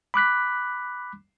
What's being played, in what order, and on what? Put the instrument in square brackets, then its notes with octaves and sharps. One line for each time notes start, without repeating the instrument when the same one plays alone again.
[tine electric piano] B5 D6 F#6 B6